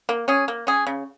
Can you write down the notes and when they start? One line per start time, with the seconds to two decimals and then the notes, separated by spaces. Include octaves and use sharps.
0.09 A#3
0.28 C#4 G#4
0.48 A#3
0.67 C#4 G#4
0.87 C#3